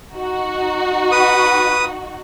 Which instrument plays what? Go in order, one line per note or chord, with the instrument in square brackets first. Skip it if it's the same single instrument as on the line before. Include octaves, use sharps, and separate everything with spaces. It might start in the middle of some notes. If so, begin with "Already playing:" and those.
[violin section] D#4 F#4
[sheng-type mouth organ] B4 D#6